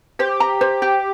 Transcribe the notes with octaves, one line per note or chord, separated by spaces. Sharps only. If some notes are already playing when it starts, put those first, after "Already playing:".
G4 C5
A#5
C5
G4